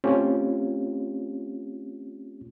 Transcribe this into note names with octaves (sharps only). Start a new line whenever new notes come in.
A3 C4 C#4 F4 G4